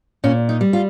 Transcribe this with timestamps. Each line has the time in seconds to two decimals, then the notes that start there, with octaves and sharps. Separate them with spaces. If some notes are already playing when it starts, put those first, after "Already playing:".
0.24 A#2 C#4
0.49 D#4
0.61 G3
0.73 F4